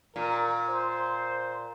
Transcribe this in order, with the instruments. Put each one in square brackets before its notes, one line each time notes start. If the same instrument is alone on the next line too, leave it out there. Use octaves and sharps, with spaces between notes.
[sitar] A#2 [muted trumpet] A#4
[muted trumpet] C5